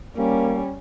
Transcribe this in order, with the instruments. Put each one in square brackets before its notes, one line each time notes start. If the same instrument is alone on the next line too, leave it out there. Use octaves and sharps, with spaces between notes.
[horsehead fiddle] G3 C#4 [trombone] A#3